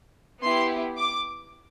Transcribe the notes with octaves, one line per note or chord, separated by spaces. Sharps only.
B3 E4 G4 C6
D6